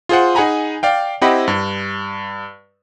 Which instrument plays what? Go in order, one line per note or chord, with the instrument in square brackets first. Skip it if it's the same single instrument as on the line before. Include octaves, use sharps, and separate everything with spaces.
[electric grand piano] F4 G#4 C5 F#5
D#4 G#4 F#5 G#5 A#5 B5
D5 F5 G5
C4 E4 G4 D#5 F#5 B5
G2